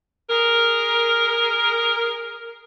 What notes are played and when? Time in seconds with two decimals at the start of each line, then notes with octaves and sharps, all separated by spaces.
0.29 G#4 A#4